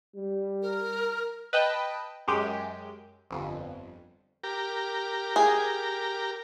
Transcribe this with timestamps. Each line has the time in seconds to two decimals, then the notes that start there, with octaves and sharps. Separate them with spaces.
0.15 G3
0.62 A#4
1.53 B4 D#5 G5 A5
2.28 F#2 G#3 G4 G6
3.31 G1 F2
4.44 G4 A#4
5.36 G#4